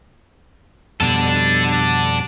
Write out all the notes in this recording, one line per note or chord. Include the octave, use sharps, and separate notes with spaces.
F2 B2 G3 D4 A4